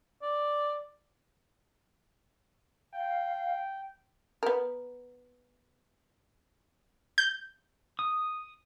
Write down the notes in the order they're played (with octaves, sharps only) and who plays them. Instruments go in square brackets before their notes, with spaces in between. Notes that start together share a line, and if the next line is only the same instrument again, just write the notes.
[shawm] D5
[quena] F5 [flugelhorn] G5
[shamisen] B3 A#4
[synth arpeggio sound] G6
[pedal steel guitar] D#6